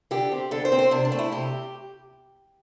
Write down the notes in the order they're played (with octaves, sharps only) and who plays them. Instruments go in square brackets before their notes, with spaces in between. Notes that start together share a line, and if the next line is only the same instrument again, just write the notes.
[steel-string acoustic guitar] D3 G4
C4
D3 A4
C5
C4
C5
C3 D4
D4
A3 C4
E4
C3 G4